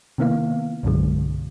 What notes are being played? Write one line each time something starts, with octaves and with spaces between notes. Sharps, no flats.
C3 D#3 A#3 B3 E4 F5
C2 G2 B2 D3 F#3 G#3